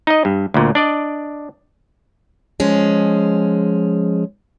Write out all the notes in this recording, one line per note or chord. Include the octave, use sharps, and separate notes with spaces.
D#4 D#5
G2
D2 A#2
D4 D5 D#5
F3 G#3 C#4